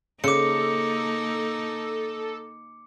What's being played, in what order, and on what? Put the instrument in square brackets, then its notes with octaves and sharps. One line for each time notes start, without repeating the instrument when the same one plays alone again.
[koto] C#3 C5 [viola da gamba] A#3 D#4 [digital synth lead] A4 [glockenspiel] D6 C#7